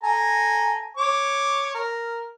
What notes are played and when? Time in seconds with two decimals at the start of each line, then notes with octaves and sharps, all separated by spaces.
0.04 A4 G#5 A#5
0.97 C#5 D6
1.75 A#4